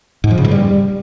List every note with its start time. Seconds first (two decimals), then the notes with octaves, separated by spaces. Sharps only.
0.24 G#2
0.31 F3
0.38 C#3
0.44 G2
0.51 G3